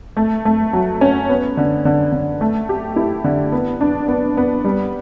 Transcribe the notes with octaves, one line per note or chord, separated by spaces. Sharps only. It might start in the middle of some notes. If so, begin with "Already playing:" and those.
A3
A3
F#3
C#4
B3
D3
D3
D3
A3
G4
E4
D3
B3
D4
B3
B3
G3